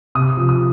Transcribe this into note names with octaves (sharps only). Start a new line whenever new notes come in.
C3 D#6
F3
D#6